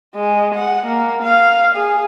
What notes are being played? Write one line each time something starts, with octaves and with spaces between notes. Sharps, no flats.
G#3
F#5
A#3
F5
G#4